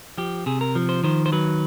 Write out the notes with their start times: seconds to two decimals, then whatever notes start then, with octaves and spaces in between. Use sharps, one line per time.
0.18 F3 G4
0.46 C3 G#4
0.61 A#4
0.75 F3
0.89 C5
1.04 D#3 C5
1.26 C5
1.32 F#3 B4